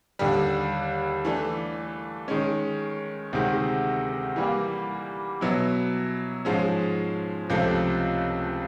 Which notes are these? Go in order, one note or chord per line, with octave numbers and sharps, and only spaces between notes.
D#2 D3 G3
E3 A3 D4
D#3 G#3 C#4
D2 C3 D#3 G#3
E3 G3 A#3
B2 F#3 B3 E4
G#2 F3 G#3 C#4
C#2 C3 F3 A3